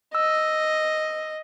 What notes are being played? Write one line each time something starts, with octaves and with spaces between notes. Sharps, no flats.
D#5 E6